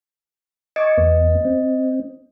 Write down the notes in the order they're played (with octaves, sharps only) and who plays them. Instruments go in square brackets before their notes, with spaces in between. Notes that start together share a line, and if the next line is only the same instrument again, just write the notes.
[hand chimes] D#5 [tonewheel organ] G#5 C#6 D6
[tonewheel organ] E2 B3
C4